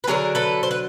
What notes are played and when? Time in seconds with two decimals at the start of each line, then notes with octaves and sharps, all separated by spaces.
0.04 B4
0.07 D3 F#3 B3 G#4 A#4
0.35 A4 B4
0.63 C5
0.71 B4